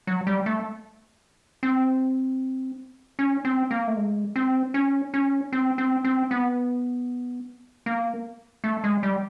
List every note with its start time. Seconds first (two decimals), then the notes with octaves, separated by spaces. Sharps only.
0.07 F#3
0.27 G3
0.46 A3
1.63 C4
3.19 C#4
3.45 C4
3.71 A#3
3.87 A3
3.97 G#3
4.36 C4
4.74 C#4
5.14 C#4
5.53 C4
5.78 C4
6.04 C4
6.31 B3
7.86 A#3
8.64 A3
8.84 G#3
9.03 G3